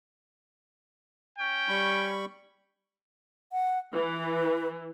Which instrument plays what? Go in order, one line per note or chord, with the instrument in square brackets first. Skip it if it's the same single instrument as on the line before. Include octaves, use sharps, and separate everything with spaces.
[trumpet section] C#4 G5
[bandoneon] G3 B5 C#6
[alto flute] F#5
[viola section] E3 [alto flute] B4